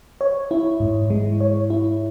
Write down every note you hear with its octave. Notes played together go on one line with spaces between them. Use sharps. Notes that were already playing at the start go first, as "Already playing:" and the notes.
C#5
E4
G#2
G#3
C#5
E4